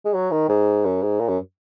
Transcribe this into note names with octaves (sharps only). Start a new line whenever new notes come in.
G#3
F#3
D#3
G#2
F#2
G#2
A#2
F#2